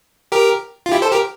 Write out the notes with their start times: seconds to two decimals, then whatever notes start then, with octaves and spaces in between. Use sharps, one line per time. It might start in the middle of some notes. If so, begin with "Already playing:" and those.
0.32 G4 A#4
0.86 F4
0.92 E4 G4
1.02 A4 C5
1.12 G4 A#4